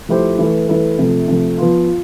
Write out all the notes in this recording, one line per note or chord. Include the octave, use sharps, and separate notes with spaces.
F3 A3 E4 G4 C5
E3 A3 E4 B4
E3 A3 E4 B4
C3 F3 A3
C3 F3 A3
F3 B3 F4
F4